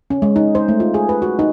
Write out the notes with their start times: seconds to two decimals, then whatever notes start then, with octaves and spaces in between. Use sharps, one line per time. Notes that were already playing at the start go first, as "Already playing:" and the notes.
0.10 C#4
0.22 G#3
0.36 D#4
0.55 C5
0.69 A3
0.80 F4
0.94 G#4
1.09 B4
1.22 F#4
1.39 D#4